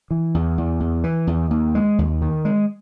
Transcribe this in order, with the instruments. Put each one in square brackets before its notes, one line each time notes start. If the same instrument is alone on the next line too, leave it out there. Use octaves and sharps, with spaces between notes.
[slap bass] E3
E2
E2
E2
E3
E2
D#2
G#3
D#2
D#3
G#3